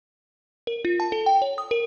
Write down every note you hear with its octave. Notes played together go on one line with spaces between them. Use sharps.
A#4
F4
A5
A4
G5
C#5
D#6
A#4